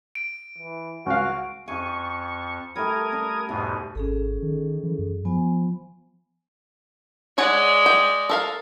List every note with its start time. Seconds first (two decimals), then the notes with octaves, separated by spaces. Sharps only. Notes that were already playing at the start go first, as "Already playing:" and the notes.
0.15 D7
0.58 E3
1.06 C#2 F#4 F5
1.68 F2 G#5 C#6
2.76 G3 A3 A#4 D#6 G#6
3.12 D4
3.49 E2 G#2 B2 G#5
3.95 G#1 C#4 G#4 A4
4.42 D#3
4.83 E3
4.98 F#2
5.25 F3 B3 G#5
7.38 G#3 G#4 C#5 D5 F#5
7.86 G5
8.29 A4 A#4 F5